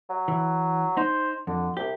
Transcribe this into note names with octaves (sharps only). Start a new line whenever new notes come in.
F#3
E3
D#4 C5
F2 D3
C2 G4